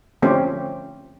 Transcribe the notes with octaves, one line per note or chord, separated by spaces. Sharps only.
D3 F3 A3 C4 C#4 G4